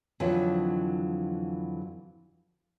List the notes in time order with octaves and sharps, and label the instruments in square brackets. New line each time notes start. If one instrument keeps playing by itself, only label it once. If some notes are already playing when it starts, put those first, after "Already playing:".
[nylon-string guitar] F2 D3 E3 F#3